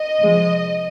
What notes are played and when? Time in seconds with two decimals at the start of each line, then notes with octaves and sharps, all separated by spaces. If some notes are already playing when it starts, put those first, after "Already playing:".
Already playing: D#5
0.20 C3 F3 G#3